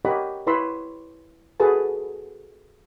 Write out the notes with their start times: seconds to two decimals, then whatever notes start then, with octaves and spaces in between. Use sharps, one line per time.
0.05 G4 A#4 C#5 D#5 F#5 B5
0.47 E4 B4 C#5 B5 C6 E6
1.60 F#4 G#4 A4 B4 A5